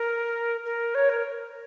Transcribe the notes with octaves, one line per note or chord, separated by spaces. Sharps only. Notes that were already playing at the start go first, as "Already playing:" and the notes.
Already playing: A#4
A#4
C#5
A#4